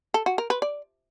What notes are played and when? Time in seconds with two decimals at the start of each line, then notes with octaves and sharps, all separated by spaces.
0.14 A4
0.26 F#4
0.38 A#4
0.50 B4
0.62 D5